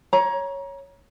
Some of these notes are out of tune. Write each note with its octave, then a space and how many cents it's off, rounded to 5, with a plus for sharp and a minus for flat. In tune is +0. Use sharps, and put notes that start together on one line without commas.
C#5 +0 A#5 +25